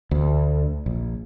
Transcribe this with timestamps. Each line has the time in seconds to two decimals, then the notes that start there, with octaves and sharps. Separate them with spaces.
0.11 D2
0.86 A#1